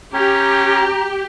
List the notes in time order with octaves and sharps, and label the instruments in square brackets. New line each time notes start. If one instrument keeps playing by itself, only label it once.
[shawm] C#4 [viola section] G4 [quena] A#5